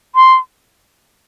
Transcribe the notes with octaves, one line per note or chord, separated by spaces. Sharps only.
C6